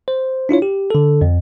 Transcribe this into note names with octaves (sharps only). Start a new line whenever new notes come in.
C5
D4 E4 F4 C#5
G4
D3 A4
F2